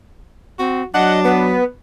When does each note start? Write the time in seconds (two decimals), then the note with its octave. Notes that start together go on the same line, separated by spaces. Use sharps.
0.59 C4 F#4
0.94 F#3 D4 D#5 F#5
1.24 B3 B4